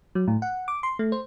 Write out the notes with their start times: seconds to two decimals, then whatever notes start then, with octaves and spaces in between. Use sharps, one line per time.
0.15 F#3
0.28 A2
0.42 F#5
0.68 D6
0.83 C6
0.99 A3
1.12 C5